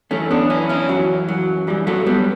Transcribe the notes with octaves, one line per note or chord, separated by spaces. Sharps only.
F#2 E3 A3 C#4
B3 D4
C#4 E4
C#4 E4
F#2 E3 F#3
F#3
F#2 E3 G3
F#3 A3
G3 B3